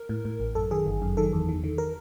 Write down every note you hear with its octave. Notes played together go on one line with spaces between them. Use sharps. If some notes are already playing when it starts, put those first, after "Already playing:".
Already playing: A#4
A2
A2
A1
F#2 A4
D#3 G#4
G1
F#2
D#3 A4
E2
D#3
D#3
A#4